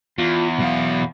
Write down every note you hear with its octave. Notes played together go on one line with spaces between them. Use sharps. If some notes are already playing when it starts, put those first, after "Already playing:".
E2 F4
B2 F#3 F5